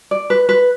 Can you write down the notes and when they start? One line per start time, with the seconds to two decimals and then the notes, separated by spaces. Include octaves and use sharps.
0.11 D5
0.30 B4
0.49 B4